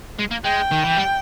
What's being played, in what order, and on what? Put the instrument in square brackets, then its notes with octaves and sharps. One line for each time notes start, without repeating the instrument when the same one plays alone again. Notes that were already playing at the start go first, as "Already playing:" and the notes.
[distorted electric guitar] G#3
A#3
[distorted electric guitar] G#3 [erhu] G5
[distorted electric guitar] D#3
E3
G3